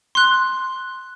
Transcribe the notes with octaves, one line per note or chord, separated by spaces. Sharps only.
C6 F#6